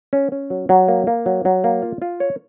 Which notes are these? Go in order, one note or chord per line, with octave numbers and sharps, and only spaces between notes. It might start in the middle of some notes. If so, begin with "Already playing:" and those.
C#4
C#4
F#3
F#3
A#3
A#3
F#3
F#3
A#3
F4
F4
C#5